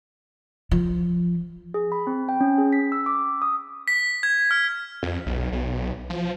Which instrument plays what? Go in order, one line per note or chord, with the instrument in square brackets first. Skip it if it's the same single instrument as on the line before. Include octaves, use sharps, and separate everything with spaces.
[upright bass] F3
[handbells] G#4
B5
C4
G5
C#4
G#4
B6
E6
D6
D#6
[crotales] B6
G#6
F6
[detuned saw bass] F2
B1
B1
F3